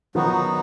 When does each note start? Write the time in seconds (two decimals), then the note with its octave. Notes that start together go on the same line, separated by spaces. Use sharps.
0.15 D#3 F3 F#3 B3 D#4 F#4